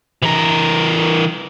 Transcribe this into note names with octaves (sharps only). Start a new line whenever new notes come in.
E3 A#4